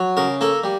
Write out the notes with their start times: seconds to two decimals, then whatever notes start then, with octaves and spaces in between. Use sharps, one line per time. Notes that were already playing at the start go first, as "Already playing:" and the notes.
Already playing: F#3
0.17 C#3 A#4
0.41 A#3 A4
0.64 G3